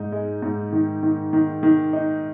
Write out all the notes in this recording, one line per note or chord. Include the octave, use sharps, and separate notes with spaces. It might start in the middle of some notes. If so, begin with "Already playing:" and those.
Already playing: G#2 D#4
G#3
G#2
D#3
D#3
D#3
D#3
D#4